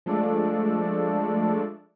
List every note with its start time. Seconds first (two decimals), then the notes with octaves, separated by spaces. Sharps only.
0.06 F3 G#3 A3 D4 A4 D5